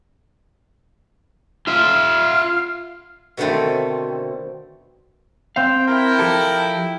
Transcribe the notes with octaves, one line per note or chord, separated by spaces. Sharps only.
F4 E5 F5
B2 D3 D#3 A3 C4
C4 F5 G5
E4 A#4 G5
F3 G4 A4